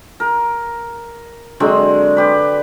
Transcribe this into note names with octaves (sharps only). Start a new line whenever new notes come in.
A#4
D3 F#3 G#3 C4
G4 B4